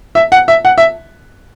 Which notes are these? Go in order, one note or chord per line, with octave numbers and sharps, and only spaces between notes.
E5
F#5
E5
F#5
E5